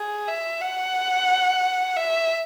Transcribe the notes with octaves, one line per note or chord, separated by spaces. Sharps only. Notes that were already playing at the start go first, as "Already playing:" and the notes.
Already playing: G#4
E5
F#5
E5